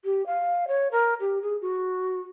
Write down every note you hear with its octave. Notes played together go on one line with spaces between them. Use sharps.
G4
F5
C#5
A#4
G4
G#4
F#4